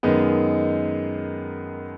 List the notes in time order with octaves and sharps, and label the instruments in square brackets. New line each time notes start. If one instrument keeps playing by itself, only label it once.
[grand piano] F#2 D#3 G#3 B3 D#4